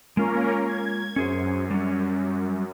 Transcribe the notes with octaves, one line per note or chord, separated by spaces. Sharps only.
G#3 A#3 C#4 F4 A#4
G#6
F#2 C#4 G#4 C5
G3 C#4